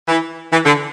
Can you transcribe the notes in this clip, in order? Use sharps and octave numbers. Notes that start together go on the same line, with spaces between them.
E3
E3
D3